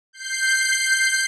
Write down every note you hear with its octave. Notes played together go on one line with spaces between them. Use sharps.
G6 C7